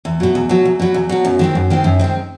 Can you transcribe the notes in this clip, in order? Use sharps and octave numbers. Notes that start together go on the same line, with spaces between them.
E2
B2 F#3
E2
B2 F#3
E2
B2 F#3
E2
B2 F#3
F#2
D#3 G#3 C4
F#2
D#3 G#3 C4
F#2
D#3 G#3 C4